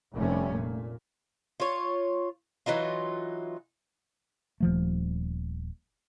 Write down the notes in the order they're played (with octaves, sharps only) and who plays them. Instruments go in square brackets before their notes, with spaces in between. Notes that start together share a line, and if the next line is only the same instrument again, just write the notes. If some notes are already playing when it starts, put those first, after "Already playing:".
[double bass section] F1 C3 G3 A3 C#4
A#2
[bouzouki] F4 C#5
E3 F#3 D#4 F4
[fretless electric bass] D#1 F3 A3